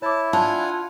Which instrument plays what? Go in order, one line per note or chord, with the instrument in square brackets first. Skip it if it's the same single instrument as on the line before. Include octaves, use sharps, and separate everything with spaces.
[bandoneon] E4 [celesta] C#5 D6 [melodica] A5
[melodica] D4 F#5 G#5 [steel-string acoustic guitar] F4 [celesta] A5